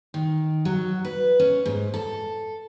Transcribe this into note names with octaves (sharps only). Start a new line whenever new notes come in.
D#3
F#3
B4
C#4
G#2
A4